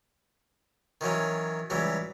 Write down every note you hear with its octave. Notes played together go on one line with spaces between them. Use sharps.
D#3 E3 F#3 C#4
C#2 E3 F#3 G3